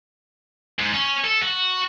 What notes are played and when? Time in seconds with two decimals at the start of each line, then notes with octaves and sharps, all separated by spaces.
0.79 G#2
0.94 C#4
1.25 A4
1.42 F#4